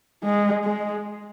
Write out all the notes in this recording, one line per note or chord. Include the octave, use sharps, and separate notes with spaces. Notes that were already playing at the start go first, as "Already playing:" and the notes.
G#3
G#3